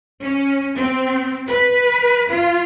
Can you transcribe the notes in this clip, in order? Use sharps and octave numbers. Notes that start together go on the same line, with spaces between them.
C#4
C4
B4
F4